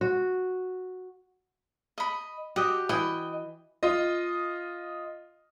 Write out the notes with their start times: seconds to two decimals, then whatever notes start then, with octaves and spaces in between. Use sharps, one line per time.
0.01 F#4
1.98 D#5 B5
2.56 F#4 G4 D#5
2.89 E3 D#5 G5
3.83 F4 D#5